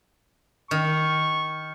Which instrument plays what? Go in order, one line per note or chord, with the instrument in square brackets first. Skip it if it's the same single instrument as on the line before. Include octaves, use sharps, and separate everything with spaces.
[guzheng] D#3 [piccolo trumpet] C#6